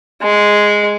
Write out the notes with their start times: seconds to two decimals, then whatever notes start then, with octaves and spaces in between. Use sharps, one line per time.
0.22 G#3